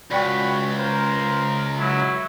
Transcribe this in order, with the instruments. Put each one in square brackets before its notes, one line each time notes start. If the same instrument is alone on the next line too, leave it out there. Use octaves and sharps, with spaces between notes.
[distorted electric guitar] C#2 [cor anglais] F#4 [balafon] D5 G5 C#6 [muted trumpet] B5
[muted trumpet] A#4 [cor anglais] C5
[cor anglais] F#3 [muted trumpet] E4